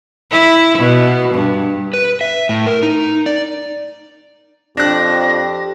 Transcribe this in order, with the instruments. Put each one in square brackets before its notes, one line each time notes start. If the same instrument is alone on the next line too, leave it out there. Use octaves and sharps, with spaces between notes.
[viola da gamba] E4
B2
G2
[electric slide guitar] B4
E5
A2
A#4
D#4
D5
[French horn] F2 [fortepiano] D4 F#6 [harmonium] G4 [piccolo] A#6